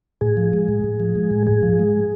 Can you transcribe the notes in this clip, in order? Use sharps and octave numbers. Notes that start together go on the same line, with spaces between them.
A2 G#4
F3
G#3
A2
A2
F3
G#3
A2
G#2 G#4
F3
G#3